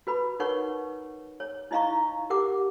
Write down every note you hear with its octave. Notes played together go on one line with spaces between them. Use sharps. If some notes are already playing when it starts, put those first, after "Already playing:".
F#4 B4 B5
D#4 A#4 B4 C#5 F#5 C#6
C#5
D#4 E4 D#5 F5 A#5 C#6
G4 A#4 F#5 D6